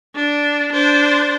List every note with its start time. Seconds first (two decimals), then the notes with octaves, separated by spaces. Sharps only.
0.16 D4
0.72 D4 C5